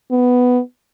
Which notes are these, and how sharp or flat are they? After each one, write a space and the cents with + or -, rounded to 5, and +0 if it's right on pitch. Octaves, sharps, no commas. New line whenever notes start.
B3 +5